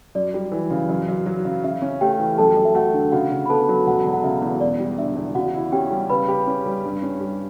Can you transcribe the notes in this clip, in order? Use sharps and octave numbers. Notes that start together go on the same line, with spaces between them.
F#2 D5
G3
E3
C#3
F#2
F#2
F#3
C#3
C#3 E5
C#4
A3 G4 G5
E3
F#2 A4 A5
F#2
E5
A3 F#4 F#5
D3
C#3 F#4 F#5
C#3
B5
B3 A4 A5
F#3
E1 F#4 F#5
E1
F#5
C#3 E5
E2
E1 D5
G3
D3 E5
E2
C#3 F#4 F#5
E4
C#4 G4 G5
G3
C#3 B4 B5
G4
C#4
G3
G2
C#4
G3